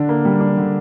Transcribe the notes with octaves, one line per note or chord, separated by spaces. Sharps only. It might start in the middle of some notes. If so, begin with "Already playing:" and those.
Already playing: D3 D4
A#3
G3
D4
D3